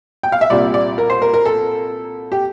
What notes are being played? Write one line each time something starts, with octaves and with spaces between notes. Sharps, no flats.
G5
F5
E5
C2 A#2 G3 D5
D5
A#4
C5
A#4
A#4
A4
G4